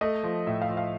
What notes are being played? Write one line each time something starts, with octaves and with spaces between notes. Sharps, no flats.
A3 D#5
F3
A2 E5
F5
F3
F5